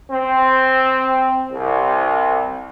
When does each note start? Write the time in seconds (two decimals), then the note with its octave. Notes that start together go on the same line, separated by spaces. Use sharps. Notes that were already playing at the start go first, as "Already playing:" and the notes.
0.12 C4
1.52 C2